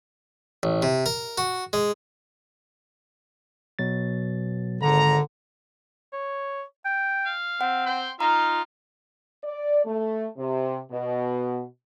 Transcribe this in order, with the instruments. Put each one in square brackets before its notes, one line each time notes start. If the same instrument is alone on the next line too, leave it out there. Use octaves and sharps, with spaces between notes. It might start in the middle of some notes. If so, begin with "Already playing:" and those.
[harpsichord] A1
C3
A#4
F#4
G#3
[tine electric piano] B2 F#3 A6
[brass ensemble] G#1 A#5 [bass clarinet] D3
[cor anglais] C#5
G5
[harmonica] F5
[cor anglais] C4 [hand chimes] F#5
[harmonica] G5 C6
[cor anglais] D#4 [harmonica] F4 F5 [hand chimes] A#5
[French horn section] D5
A3
C3
B2